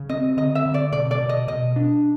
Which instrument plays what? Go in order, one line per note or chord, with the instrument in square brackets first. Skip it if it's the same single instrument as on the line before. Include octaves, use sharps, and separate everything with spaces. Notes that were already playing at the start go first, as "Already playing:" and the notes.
Already playing: [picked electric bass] C#3
[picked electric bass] C4 [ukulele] D#5
[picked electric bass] D3 [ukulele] D#5
[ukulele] E5
[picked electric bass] D3
[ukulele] D5
[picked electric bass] B2 [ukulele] D5
[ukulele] D5
[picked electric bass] B2
[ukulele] D#5
[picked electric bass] B2 [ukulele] D#5
[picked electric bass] D4